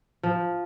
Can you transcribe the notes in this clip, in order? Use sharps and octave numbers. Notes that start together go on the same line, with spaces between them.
F3